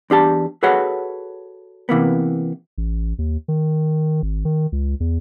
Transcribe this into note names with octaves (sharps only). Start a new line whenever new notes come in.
E2 D4 G4 A5
F#4 G#4 A4 B4 C#5 F#5
C3 E3 A#3 B3
A1
D#2
D#3
G#1
D#3
C#2
E2